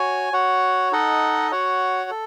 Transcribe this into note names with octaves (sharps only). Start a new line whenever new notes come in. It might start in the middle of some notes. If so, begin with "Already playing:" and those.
Already playing: F#4 C#5 G#5
F#4 C#5 F#5
D#4 A4 D#5 F#5
F#4 C#5 F#5
A4